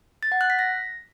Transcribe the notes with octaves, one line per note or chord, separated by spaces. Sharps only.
A6
F#5
F#6
B6
A#6